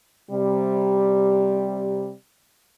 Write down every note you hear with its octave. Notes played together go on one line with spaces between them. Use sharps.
C3 G3